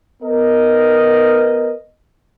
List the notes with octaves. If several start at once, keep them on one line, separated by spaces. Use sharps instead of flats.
B3 A#4 D#5